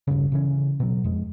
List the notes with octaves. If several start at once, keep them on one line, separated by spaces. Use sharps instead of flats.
D1 G2 C#3
C#3 E3 C#4
B2 F#3
F2 G#3